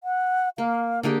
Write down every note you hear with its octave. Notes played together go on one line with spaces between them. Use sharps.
F#5
A#3 F5
D3 A#3 G4 G#4